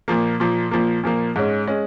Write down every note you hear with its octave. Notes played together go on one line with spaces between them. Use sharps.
A#2 F3 A#3
A#2 F3 A#3
A#2 F3 A#3
A#2 F3 A#3
G#2 G#3 C#4
G#3 C#4